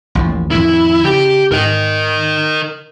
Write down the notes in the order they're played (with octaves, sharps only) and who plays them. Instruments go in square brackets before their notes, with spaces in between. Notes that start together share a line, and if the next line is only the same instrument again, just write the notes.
[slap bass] A1 D#2 F3
[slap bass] F2 A2 D#3 [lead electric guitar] E4
[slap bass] C#3 [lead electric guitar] G4
[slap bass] G#2 [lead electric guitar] A#4 D#5